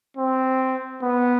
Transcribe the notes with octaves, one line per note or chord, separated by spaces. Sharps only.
C4
B3